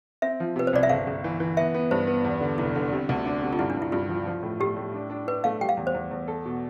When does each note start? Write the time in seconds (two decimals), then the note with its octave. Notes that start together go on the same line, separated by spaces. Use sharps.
0.22 C4 E5
0.40 F3
0.56 C3 B4
0.67 C5
0.73 C2 D5
0.83 E5
0.89 G1 F5
1.07 G1
1.24 E3
1.40 E3
1.57 B3 E5
1.74 B3
1.91 G2 C5
2.07 B3
2.25 E2
2.41 D3
2.58 F1 E4
2.75 D3
2.92 C3
3.09 D2
3.26 D4
3.43 C3
3.53 F4
3.59 G2 E4
3.70 D4
3.76 G2
3.82 E4
3.92 G2 F4
4.09 F3
4.27 F3
4.43 A2
4.60 A2 G4
4.77 A2
4.94 D4
5.10 D4
5.27 D4 B4
5.44 A3 F5
5.61 G3 G5
5.69 F5
5.77 E2
5.87 C5
5.94 E2
6.11 E2
6.28 A4
6.45 B2